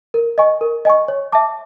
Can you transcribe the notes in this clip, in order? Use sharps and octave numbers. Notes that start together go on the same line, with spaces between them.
A#4
D#5 G#5 C#6
A#4
D#5 G#5 C#6
C#5
E5 A5 D6